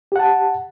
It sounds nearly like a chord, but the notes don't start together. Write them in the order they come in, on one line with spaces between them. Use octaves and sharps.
G4 F#5 A5